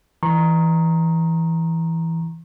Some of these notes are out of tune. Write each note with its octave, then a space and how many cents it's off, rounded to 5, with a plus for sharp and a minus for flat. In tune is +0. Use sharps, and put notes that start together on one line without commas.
E3 +0 A#5 +0 C#6 -45